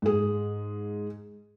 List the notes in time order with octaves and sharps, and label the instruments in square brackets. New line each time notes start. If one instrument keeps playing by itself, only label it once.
[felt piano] G#2 G#4